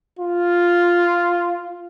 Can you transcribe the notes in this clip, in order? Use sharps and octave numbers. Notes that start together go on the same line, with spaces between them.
F4